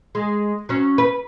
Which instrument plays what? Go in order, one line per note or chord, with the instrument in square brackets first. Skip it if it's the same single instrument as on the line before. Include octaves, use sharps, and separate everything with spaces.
[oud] G#3
F#3 C#4
B4